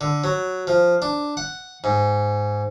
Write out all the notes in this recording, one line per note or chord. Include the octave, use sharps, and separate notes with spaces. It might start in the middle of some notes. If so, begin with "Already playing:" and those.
D3
F#3
F3
D4
F#5
G#2